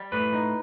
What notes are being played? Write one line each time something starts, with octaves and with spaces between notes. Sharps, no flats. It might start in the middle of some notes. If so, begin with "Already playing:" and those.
Already playing: G3
A2 B4
D#4